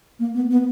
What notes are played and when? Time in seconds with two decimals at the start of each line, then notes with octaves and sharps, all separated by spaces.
0.19 A#3
0.34 B3
0.51 B3